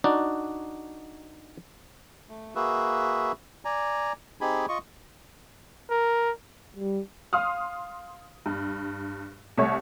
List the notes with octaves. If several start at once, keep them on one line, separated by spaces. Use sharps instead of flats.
D4 D#4 F#4 D5
A3
A#3 F#4 G#4 B4 E5
D5 G#5 A#5
C4 D#4 G4 G#4 G#5 B5
F4 D#5 C#6
A#4
G3
F5 C6 D#6 F6
G2
C2 A3 C#5